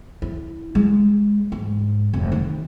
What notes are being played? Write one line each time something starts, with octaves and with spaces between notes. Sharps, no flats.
E4
G#3
G#2
F1
D#3